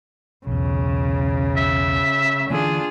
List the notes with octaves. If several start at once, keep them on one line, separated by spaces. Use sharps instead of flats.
B1 E2 C#3
E5
D3 E3 A#3 D4 F4 G#4